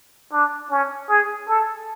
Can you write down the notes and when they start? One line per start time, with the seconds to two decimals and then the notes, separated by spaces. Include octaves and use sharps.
0.33 D4
0.71 C#4
1.09 G#4
1.49 A4